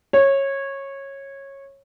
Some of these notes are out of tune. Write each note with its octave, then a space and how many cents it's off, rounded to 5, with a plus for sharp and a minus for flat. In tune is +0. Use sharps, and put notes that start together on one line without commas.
C#5 -15